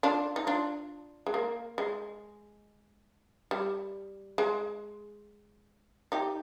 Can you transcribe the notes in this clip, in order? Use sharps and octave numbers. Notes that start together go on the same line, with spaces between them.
D4 F4
D#4
D4 F4
G#3
A#3
G#3
G3
G#3
D#4 G4